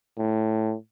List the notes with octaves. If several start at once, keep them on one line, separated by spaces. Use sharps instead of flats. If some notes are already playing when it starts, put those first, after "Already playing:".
A2